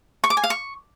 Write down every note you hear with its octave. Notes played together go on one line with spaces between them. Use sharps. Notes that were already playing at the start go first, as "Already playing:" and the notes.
C#6
D6
G#5
F5
C#6